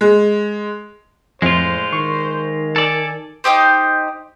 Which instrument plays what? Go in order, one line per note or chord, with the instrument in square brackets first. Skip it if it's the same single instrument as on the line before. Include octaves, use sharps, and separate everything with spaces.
[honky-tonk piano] G#3
[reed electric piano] F2 [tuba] A2 [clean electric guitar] G#3 F4 [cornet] C5
[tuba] D#3 [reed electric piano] C#6
[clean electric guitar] A4 D5 [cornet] G#5
[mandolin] D#4 E4 G4 C5